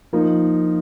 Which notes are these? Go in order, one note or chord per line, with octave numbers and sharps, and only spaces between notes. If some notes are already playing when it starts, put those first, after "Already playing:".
F3 A#3 D#4